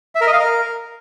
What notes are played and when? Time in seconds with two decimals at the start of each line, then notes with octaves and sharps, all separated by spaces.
0.15 E5
0.21 A#4
0.27 D#5
0.33 F5
0.39 A#4